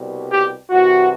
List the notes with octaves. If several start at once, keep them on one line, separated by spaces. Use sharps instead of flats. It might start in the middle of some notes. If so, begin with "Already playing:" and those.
Already playing: C2 B2 G3
G4
C2 C3 E3 F#4